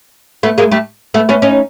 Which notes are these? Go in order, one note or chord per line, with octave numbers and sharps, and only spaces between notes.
A3 B3
G#3 A#3
G3 A3
A3 B3
B3 C#4
C#4 D#4